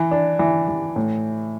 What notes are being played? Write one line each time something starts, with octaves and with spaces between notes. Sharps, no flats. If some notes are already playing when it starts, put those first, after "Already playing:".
Already playing: E3
D4
E3
E3
A2